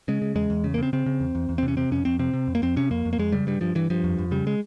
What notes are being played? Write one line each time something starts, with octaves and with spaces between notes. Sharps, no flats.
C#3 G#3
C#3
E2 G#3
E2
C#3
A#3
C#3 C4
C#3 C4
C#3
E2
E2
E2
C4
C3
C#4
C3 C4
F2 C#4
F2 C4
C3 C4
C3
F2
A#3
F2 C4
C3 C#4
F2 A#3
F2
A#3
F2 G#3
C#3 G3
G2 G3
G2 F3
G2 E3
G2 F3
F2
F2
C#3 G3
G#3